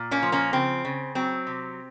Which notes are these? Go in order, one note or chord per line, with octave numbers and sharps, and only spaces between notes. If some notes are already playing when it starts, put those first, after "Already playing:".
Already playing: A#2
A#3 C#4
F3
A#3 C#4
C#3 C4
C#3
F#3 C4
C3